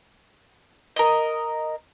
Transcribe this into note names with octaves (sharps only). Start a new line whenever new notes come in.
A#4 D#5